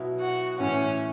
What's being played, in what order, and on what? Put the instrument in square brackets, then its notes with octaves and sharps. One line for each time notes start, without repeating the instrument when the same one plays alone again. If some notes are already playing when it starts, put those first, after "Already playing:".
Already playing: [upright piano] B2 F#3 B3 E4
[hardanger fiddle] F#4
[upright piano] A2 E3 A3 E4 [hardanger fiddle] C#4